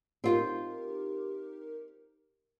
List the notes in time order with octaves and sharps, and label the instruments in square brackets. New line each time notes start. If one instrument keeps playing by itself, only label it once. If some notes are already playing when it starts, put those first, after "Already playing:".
[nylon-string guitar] C4 F4 C5 [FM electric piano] D#4 G4 A#4